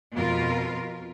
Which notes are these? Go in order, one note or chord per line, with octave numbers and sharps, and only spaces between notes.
F2 B2 F4 A#4